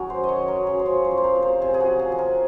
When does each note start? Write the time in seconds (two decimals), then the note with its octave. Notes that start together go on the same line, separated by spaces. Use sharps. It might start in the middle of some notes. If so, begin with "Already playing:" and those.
Already playing: F#2 D#3 F#4 G#4 A#4
0.10 F#3 C5
0.24 D#5
0.29 C#5
0.35 D#3
0.48 A#4
0.60 F#2
0.67 G#4
0.79 C5
0.86 F3 C#5
1.05 C5
1.11 F3
1.18 C5
1.24 A#4
1.36 C3
1.42 C5
1.62 C3 G#4
1.74 G#4
1.80 F#4
1.87 F3
1.99 G#4
2.12 F3 G#4
2.19 A#4